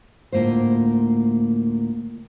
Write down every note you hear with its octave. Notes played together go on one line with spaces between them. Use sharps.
D2 A2 A#3 F4 C5